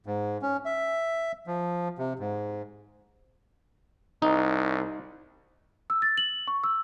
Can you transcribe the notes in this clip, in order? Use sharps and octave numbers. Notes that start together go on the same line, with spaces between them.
G#2
C#4
E5
F3
C3
G#2
C2 D#4
E6
A6
F#7
C#6
E6